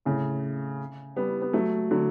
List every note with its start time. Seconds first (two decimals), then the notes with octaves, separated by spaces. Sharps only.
0.05 A2 C#3
1.16 G3 B3
1.42 B3
1.53 F#3 A3
1.91 D3 F#3